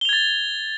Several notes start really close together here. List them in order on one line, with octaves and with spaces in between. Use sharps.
G7 F7 G#6 A6